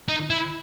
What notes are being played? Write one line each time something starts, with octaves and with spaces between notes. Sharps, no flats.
D#4
E4